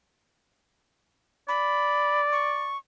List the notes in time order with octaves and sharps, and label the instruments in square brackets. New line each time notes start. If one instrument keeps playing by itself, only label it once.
[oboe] D5 [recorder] B5
[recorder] C#6